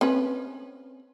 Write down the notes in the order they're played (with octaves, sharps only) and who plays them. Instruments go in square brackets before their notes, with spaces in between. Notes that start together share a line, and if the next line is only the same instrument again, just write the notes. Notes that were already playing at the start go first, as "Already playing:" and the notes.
[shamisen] C4 C#4 B4